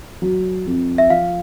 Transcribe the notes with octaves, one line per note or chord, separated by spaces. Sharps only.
F#3
F2
E5
F3 F5